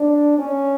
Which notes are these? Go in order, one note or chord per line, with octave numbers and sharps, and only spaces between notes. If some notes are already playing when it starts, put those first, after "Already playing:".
Already playing: D4
C#4